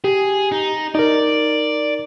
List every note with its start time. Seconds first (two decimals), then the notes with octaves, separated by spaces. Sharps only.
0.04 G4 G#4
0.52 D#4
0.95 D#4 A#4 D5